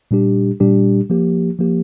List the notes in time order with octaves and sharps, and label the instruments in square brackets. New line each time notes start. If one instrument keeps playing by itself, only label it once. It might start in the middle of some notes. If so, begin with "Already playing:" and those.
[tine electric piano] A#2 G3 D4 G4
A#2 G3 D4 G4
F3 A#3 G4
F3 A#3 G4